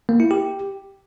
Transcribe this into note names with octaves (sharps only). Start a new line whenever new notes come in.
A#3
E4
G4